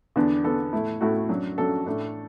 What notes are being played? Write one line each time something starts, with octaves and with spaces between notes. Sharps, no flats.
E2 D3 B3 D4
E2 D3 B3 D4 A4
A2 A3 E4
A2 A3 E4 F#4
F#2 F#3 D4
F#2 F#3 D4 A4
A2 A3 D4